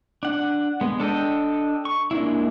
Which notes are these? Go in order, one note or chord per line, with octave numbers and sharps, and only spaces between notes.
D4 F#5
G#3 B3
D4 A4 D#5 G5
C#6
G#3 A#3 D4 E4